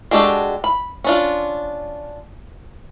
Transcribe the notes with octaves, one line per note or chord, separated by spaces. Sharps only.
G#3 D4 F#4 G4 A4
B5
C#4 D4 F4